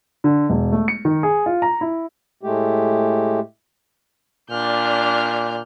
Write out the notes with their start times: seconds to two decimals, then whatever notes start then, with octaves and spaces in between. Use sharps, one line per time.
0.24 D3
0.49 E1
0.72 A3
0.88 C#7
1.05 D#3
1.23 G#4
1.46 F4
1.62 A#5
1.81 E4
2.43 A2 G#3 A3 G4
4.50 A#2 D4 F6 G6